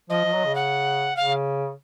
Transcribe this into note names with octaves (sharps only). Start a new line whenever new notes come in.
F3 D#5
F3
F#3
C#3
F#5
C#3 F5